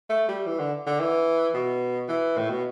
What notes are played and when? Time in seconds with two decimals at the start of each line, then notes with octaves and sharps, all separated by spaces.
0.10 A3
0.28 G3
0.46 E3
0.60 D3
0.86 D3
1.00 E3
1.54 B2
2.08 E3
2.37 A2
2.50 B2